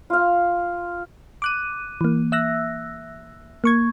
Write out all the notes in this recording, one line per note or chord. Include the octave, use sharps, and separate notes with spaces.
F4 F5
D6 F#6 D#7
E3 A#3
E5 E6 F#6 A#6
A#3 C#6 G#6